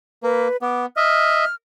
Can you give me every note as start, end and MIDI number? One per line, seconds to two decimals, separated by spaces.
0.23 0.48 58
0.23 0.57 71
0.62 0.86 59
0.62 0.83 86
0.97 1.45 75
0.97 1.45 76
0.97 1.55 89